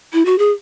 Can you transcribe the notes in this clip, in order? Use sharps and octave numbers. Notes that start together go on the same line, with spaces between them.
E4
F#4
G#4